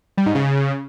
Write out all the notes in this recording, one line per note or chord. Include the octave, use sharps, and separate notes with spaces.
G3
G#2
C#3